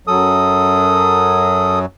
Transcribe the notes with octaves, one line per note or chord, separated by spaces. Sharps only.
F#2 F#3 A4 D#6